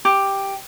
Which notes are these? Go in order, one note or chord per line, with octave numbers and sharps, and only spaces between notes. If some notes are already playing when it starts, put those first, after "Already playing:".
G4